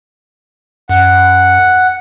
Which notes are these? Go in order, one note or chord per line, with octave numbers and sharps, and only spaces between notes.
F#2 F#5